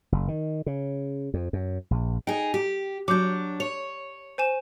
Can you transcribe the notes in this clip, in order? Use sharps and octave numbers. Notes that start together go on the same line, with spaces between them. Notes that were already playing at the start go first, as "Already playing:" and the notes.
F#1
D#3
C#3
F2
F#2
A#1
D#4 G#4 G5
G4
F#3 D4 D6 G6
C#5 F7
C5 G#5 E7